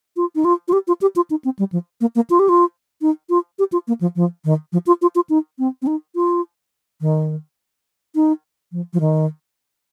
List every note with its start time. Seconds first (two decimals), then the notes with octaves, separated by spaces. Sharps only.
0.16 F4
0.35 D#4
0.44 F4
0.68 F4
0.73 G4
0.87 F4
1.01 G4
1.16 F4
1.30 D#4
1.44 C4
1.59 G3
1.72 F3
2.01 A#3
2.15 A#3
2.30 F4
2.39 G4
2.49 F4
3.01 D#4
3.29 F4
3.59 G4
3.72 F4
3.87 A#3
4.01 F3
4.16 F3
4.45 D#3
4.72 F3
4.86 F4
5.02 F4
5.15 F4
5.29 D#4
5.59 C4
5.82 C4
5.87 D#4
6.15 F4
7.01 D#3
8.15 D#4
8.72 F3
8.93 F3
9.00 D#3